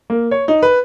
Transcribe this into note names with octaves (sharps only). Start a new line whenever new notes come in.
A#3
C#5
D#4
B4